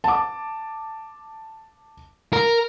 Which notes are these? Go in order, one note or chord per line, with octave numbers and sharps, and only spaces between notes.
A5 D6
A#4